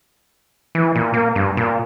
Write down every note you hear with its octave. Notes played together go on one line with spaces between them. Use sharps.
E3
A#2
A#3
G2
A#2